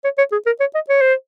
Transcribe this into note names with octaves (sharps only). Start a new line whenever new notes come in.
C#5
C#5
G#4
A#4
C#5
D#5
C#5
C5